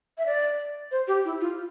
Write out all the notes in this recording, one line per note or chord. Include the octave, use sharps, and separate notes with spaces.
E5
D5
C5
G4
E4
F4